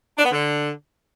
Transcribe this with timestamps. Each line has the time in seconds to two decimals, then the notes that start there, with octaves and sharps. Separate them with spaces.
0.18 D4
0.25 B3
0.32 D3